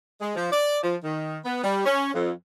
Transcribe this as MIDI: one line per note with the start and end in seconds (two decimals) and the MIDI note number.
0.21 0.31 56
0.35 0.51 53
0.52 0.78 74
0.83 0.96 53
1.04 1.37 51
1.45 1.63 59
1.63 1.83 55
1.85 2.11 61
2.14 2.31 41